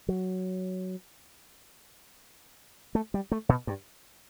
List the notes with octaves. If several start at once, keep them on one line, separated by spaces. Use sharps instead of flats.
F#3
A3
G3
A3
B2
G2